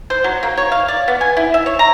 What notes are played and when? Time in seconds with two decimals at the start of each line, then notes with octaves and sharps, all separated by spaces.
0.10 C5
0.24 F#3
0.43 A#3
0.57 C#5
0.72 F5
0.88 D5
1.08 B3
1.21 G#5
1.37 E4
1.54 E5
1.66 C#5
1.79 A#5